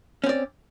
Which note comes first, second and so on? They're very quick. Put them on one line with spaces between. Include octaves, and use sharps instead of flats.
C#4 C4 D5